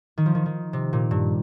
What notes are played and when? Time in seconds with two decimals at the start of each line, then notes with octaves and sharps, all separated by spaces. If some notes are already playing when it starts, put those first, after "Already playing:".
0.18 D#3
0.26 F3
0.35 D#3
0.46 D#3
0.73 C3
0.93 A#2
1.11 G2